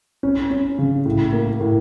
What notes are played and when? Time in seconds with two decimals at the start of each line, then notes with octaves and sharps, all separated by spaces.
0.23 C#4
0.51 C#4
0.78 C#3
1.06 A2
1.33 A#3
1.61 A2